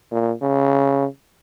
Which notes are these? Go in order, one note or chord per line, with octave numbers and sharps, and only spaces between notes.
A#2
C#3